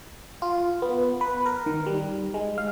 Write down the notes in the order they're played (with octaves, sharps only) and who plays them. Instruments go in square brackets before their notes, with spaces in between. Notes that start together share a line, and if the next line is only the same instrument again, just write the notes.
[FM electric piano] F4
B3
B4
A#4
D#3
G3
G#3
F5